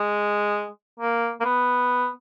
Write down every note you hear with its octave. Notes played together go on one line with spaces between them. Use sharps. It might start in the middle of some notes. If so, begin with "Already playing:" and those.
Already playing: G#3
A#3
A#3
B3